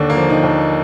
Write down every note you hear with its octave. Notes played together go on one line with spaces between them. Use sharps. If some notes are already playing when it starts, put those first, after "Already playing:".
Already playing: D#2 D3 D4
A#3
F3
D#3 D#4
D#2